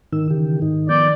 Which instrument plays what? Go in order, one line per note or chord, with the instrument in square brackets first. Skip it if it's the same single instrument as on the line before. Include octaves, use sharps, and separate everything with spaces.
[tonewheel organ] G#2 D#4 E6 [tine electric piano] D#3
[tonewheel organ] C#3 E3 G4
G#2 D#4
[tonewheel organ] F3 B3 G6 [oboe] D5